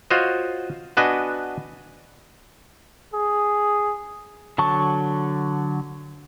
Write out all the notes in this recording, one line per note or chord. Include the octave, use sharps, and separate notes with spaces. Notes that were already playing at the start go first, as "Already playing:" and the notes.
F4 F#4 C5 C#5 D#5
B3 D4 F#4 B4 D#5 G#5
G#4
D3 F#3 A5 C#6